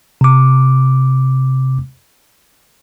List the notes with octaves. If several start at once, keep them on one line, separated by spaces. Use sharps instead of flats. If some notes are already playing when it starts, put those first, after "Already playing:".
C3 D6